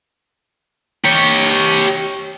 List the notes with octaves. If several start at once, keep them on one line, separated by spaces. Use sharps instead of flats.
G4 C#5